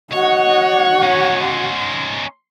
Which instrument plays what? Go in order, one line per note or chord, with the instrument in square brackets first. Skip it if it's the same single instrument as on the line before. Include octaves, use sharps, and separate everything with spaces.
[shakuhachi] F#4 [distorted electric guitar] C#5 [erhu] D#5 [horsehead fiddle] F#5
[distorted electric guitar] C#4 D#4 [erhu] C#5
[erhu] C6